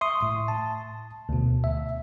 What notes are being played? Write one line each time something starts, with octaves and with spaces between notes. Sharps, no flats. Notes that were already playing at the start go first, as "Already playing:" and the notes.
E5 C6 C#6 D#6
A2
A5
D2 B2
E5